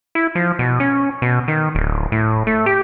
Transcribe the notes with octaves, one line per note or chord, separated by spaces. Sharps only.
E4
F3
B2
C#4
B2
D#3
D1
A2
A3
G4